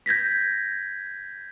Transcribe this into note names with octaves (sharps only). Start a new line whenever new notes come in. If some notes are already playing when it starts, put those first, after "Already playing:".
G6 G#6 A#6 B6